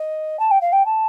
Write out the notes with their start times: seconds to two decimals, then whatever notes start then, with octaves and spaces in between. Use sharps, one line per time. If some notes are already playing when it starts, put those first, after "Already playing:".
Already playing: D#5
0.39 A5
0.51 G5
0.61 F5
0.72 G5
0.85 A5